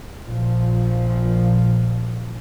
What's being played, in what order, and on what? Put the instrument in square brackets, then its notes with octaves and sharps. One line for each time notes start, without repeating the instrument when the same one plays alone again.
[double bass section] A#1 A#2 F3